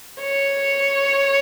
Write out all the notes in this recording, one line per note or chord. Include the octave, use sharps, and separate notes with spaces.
C#5